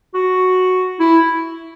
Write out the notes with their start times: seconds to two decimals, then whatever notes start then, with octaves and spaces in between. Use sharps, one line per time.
0.14 F#4
1.00 E4